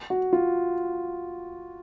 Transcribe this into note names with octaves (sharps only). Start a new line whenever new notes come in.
F#4
F4